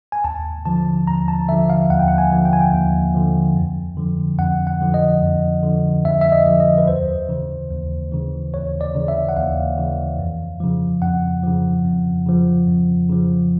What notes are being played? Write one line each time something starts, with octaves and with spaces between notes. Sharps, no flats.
G#5
D#2 A5
D3 F3 A5
D#2 A#5
A5
D3 F3 E5
F5
D#2 F#5
G5
F#5
G#5
D3 F3
G5
G#5
G5
D#2
D3 F3
F2
D3 F3
F2 F#5
F#5
D3 F3
D#5
F2
D3 F3
F2 E5
E5
D#5
D3 F3
D#5
B4
D#2 C5
C#3 E3
D#2
C#3 E3
D#2 C#5
D5
C#3 E3
E5
F#5
D#2 F5
C#3 E3
F2
C#3 F3
F2 F#5
C#3 F3
F2
C#3 F3
F2
C#3 F3